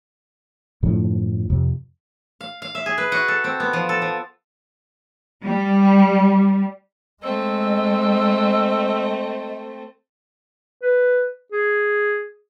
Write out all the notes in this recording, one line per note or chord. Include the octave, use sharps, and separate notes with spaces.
F#2 A2 D3 F3
F2 C3
F5
F5
E5
G#4
B4
F#4
A4
C4
B3
F3
A4
F3
G3
G#3 A3 C4 D#5 E6
B4
G#4